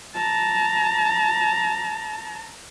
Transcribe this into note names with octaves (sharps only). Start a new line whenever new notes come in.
A5 A#5